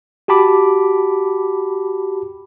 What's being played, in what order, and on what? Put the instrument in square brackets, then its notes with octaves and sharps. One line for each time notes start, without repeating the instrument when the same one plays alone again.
[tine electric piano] F#4 G4 A5 B5 D6